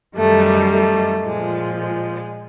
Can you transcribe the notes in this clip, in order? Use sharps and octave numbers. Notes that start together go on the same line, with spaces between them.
F#2 D#3 G3 A3
A3
A#2 F3 G#3
G#3